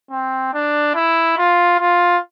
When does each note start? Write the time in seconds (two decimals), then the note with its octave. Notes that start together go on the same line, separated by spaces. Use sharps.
0.11 C4
0.53 D4
0.95 E4
1.37 F4
1.80 F4